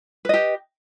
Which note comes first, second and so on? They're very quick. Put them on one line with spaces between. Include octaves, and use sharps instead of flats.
B4 D#5 G4